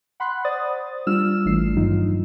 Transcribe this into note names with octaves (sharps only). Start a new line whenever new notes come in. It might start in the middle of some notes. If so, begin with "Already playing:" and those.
F#5 B5 C6 F#6
C5 D5 D#6 A6
G3 D4 F4 E6 F6 E7
G#1 E3 A3 D4 C7
G2 D#3 F#3 D#4 F4